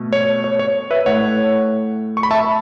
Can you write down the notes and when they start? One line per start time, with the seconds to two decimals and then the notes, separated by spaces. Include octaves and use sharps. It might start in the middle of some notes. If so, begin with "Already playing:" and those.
Already playing: B2 A3
0.13 C#5
0.44 C#5
0.59 C#5
0.91 B4 E5
1.06 A2 A3 C#5 F#5
2.17 C#6
2.23 B5
2.31 E5 A5